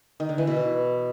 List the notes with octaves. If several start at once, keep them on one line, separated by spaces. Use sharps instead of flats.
D#3
D3
E3
B2
E3